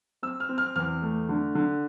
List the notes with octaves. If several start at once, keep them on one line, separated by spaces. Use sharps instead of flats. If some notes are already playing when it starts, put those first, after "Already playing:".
C4 E6
F6
C4
F6
E2 F6
A3
D3
D3